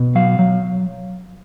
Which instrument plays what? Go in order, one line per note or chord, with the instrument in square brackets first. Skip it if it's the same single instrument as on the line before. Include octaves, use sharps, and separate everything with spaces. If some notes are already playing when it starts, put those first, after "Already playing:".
Already playing: [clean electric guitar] B2
F#3 F5
F#3